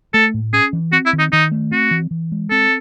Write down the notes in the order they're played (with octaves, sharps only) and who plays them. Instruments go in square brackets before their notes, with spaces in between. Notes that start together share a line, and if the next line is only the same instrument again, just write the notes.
[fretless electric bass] A3 [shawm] A4
[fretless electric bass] A2
[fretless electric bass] C#4 [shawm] G#4
[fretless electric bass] E3
[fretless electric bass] C4 [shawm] F#4
[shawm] E4
[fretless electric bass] D#3
[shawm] D#4
[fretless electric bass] D#3 [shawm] D#4
[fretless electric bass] A3
[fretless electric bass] C4 [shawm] F#4
[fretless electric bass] E3
E3
G#3
[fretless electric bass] C4 [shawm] A4